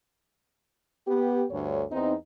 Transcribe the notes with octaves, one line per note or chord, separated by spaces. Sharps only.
B3 G4
D2 G2 D3 C#5
E2 C4 D#4